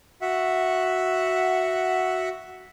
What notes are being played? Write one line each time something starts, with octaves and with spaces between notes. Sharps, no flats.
F#4 E5 F#5